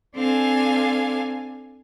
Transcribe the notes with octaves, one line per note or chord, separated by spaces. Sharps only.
C4 D4 A4 F5 G#5